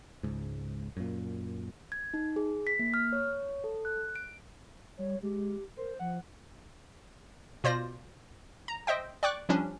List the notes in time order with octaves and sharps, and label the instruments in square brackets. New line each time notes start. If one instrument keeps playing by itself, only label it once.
[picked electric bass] C#2 G#2
F#2 A#2
[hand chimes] G#6
D#4
G#4
B6
A#3
F6
C#5
A4
F#6
D7
[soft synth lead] G3 [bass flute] C#5
[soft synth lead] G#3 [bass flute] G4
[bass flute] A#4 [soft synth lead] C5
[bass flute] F3 [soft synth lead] F#5
[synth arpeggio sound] B2 F4 C5 D5 A#6
A#5
C5 D#5 E5 G5
D5 G5 C#6 D6 F#6
F3 G3 C#4 D4